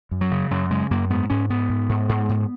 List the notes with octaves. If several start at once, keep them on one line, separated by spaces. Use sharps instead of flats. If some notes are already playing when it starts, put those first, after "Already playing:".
F#2
F#3
C#3
F#2 F#3
C#3 G#3
F#2 A#3
G#2 B3
G#2 C#4
G#2 B3
G#2
G#2
G#2
G#2